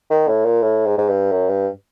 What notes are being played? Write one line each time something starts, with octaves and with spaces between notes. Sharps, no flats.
D#3
A2
A#2
A2
G#2
G#2
G2
F#2
G2